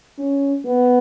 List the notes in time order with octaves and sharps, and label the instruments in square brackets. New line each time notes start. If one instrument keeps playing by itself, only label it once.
[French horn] C#4
B3